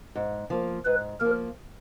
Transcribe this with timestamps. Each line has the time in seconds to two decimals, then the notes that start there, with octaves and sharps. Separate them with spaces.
0.15 G#2
0.50 F3 A#3
0.85 G#2 B4
1.20 F3 A#3 A#4